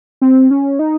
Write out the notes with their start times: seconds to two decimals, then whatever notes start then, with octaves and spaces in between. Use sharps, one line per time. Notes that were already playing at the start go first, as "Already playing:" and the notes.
0.21 C4
0.51 C#4
0.79 D#4